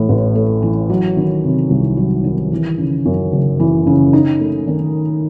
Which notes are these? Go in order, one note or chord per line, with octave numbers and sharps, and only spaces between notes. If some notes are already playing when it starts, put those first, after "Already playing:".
Already playing: A2 E3
A1
A3
E3
F#3
D#3
C3
C2
F#3
D#3
E3
C#3
F#2
F#1
E3
C#3
D#4
A3
D#3